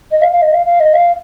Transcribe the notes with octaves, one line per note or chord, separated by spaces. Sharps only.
D#5
F5
F5
D#5
F5
F5
D#5
F5